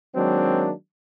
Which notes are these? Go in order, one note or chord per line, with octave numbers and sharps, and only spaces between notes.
D#3 F#3 G#3 A#3 C4 D4